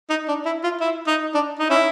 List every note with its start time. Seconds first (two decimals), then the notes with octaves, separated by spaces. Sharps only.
0.10 D#4
0.28 D4
0.46 E4
0.64 F4
0.80 E4
1.07 D#4
1.34 D4
1.59 D#4
1.70 C#4 E4